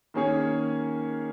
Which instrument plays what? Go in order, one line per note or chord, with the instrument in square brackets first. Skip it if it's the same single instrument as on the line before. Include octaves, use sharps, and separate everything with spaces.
[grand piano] D#3 A#3 C#4 G#4 C#5